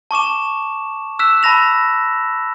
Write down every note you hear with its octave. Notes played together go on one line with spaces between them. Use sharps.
A5 C#6 D6 E7
E6 F#6 B6 E7
A5 B5 A#6 F7